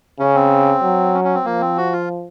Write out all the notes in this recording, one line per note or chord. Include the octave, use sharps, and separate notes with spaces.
C#3 C#4
C4
F#3
C#4
C#4
C4
F3 A#3
C4
F#4
F4